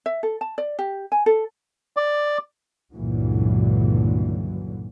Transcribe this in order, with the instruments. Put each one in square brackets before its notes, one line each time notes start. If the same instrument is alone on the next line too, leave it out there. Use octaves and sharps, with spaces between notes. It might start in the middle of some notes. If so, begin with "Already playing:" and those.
[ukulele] E5
A4
A5
D5
G4
G#5
A4
[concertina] D5
[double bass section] C#2 G2 A#2 D3 E3 F#3